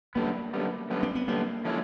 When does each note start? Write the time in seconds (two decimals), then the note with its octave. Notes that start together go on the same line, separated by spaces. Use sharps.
0.15 F#2 D3 G3 A#3 B3
0.54 F#2 D3 G3 B3
0.90 F#2 D3 G3 B3
1.03 C4
1.15 B3
1.28 F#2 D3 G3 A#3 B3
1.65 D3 F3 G#3 C#4 E4